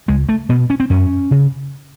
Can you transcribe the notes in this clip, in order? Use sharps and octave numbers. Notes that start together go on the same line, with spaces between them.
C#2 G#3
A3
B2 B3
C#4
C4
F#2 C#4
C#3